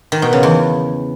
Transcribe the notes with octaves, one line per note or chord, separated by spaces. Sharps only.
D#3
B2
C#3
E2